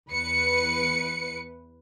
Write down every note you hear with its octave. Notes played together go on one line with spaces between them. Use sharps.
E2 B4 C#7